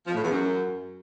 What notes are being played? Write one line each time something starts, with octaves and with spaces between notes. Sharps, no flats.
F3
A2
E2
F#2